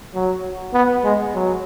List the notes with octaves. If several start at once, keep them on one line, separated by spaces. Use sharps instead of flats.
F#3
B3
G#3
F#3